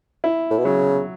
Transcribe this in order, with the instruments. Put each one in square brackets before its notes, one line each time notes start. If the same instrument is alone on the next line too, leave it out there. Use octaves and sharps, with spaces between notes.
[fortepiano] E4
[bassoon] A2
B2
[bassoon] C#3 [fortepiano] F#3